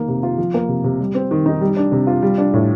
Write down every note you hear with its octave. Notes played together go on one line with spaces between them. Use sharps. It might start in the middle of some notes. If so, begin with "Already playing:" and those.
Already playing: D#3 A#3
C3
F4
F3
A#3
C3
C3
G3
C4
D#3
D#4
G3
D4
C3
F4
G3
D4
A2